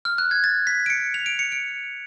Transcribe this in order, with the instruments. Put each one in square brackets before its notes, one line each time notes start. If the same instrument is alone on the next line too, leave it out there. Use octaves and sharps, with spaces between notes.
[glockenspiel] F6
F#6
G#6
A6
B6
D7
C#7
F7
D7
C#7
D7